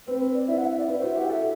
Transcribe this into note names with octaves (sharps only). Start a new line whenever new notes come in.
C4 B4
B4
D5
E4 E5
F#5
E5
D5
E4 B4
C5
F#4
E5
G4 F#5
A4 E5